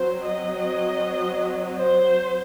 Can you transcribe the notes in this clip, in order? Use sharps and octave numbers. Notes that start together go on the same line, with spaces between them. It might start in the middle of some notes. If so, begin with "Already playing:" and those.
Already playing: F#3 C4 C5
D#5
C5